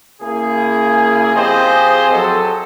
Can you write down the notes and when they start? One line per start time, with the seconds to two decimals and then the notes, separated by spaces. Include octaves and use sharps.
0.22 C#3 A#3 E4 G#4
1.35 F3 C4 G4 G#4 C5 D#5
2.12 F#3 A4